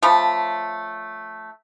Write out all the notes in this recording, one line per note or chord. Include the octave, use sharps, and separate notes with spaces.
C#3 F3 A3